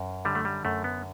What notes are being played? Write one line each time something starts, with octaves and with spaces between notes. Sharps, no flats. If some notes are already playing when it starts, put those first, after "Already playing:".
Already playing: F#2
D3 G3
A3
G3
F#2 A3
B3